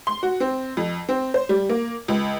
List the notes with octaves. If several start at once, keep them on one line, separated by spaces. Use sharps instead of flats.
C6
F#4
C4
F2
C4
C5
G3
A#3
C#2